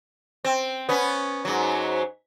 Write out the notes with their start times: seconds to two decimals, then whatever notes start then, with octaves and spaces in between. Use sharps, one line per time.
0.45 C4
0.89 B3 C#4
1.45 G#2 F#3